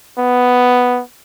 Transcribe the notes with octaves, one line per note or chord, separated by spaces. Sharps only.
B3